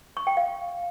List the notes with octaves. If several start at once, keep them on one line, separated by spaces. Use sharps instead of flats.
C#6
G5
F5